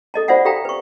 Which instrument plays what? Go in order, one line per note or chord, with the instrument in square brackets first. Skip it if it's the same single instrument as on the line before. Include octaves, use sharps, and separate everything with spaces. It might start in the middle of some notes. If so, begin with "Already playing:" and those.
[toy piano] A4 D#5 A5
F4 C5 D5 E5 F#5 G#5
G4 A4 E5 F5 G5 A#5
B4 C#6